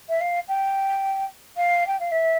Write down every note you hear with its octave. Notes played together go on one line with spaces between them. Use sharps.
E5
F5
G5
F5
G5
F5
E5